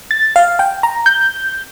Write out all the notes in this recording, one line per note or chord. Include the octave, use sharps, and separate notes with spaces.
A6
F5
G5
A#5
G6